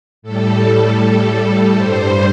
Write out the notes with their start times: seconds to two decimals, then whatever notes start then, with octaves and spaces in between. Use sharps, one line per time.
0.22 A2 G3 A4
1.76 G2 G3 C5